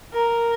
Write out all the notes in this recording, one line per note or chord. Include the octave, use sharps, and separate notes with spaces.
A#4